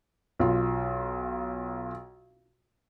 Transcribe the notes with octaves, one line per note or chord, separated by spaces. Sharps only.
B1 F4